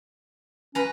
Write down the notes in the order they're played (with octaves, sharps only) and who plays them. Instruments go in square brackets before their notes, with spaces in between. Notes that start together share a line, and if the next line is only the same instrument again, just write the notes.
[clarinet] C#4 [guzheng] B4 A#5